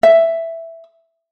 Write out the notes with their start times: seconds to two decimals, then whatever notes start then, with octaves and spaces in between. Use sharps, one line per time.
0.03 E5